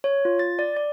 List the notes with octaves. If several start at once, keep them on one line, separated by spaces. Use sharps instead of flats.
C#5
F4
A6
D5
D5